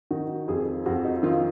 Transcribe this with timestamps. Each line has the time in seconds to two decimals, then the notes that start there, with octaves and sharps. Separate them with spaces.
0.11 D#3 F#4
0.48 F2 G#4
0.86 F2 F#4
1.05 D#4
1.23 D#3 F4